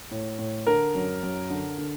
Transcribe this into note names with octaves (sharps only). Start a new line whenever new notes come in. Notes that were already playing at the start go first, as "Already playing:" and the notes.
A2
A2
D3 A#4
F#2
F#2
D3
D3